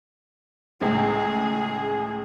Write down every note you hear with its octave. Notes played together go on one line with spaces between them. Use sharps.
C#2 A2 G#4